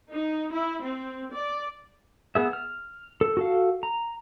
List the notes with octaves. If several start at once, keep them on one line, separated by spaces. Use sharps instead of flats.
D#4
E4
C4
D5
B3 G#4 E5
F6
A4
F#4 A4 F5
A#5